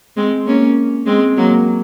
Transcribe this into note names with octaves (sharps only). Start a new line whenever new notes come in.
G#3 C4
A#3 C#4
G#3 C4
F#3 A#3